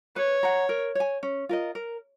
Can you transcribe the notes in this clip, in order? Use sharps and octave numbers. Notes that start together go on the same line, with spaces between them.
B4 C#5
F#5 A#5
A#4
C#5 G#5
C#4
F4 A#4 D#5
A#4